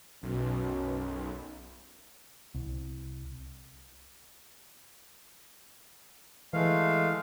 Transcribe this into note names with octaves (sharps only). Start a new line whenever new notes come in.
B1 F#2
C2
E3 G#3 A3 F5